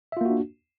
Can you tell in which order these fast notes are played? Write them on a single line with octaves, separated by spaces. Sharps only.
E5 F4 A#3 F#4 D4